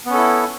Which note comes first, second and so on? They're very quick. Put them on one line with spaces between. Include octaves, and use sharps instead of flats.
B3 C#4 A4 E4